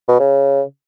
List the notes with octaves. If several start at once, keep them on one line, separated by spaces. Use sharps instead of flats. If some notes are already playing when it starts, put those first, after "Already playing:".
B2
C#3